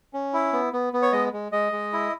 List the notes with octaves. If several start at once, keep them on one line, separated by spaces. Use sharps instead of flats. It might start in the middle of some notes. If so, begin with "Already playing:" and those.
C#4
E4
B3
B3
B3
C#5
G#3 D#5
G#3
G#3 D#5
G#3
E4